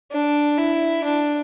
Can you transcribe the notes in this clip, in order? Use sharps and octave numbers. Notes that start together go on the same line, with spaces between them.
D4
E4
D4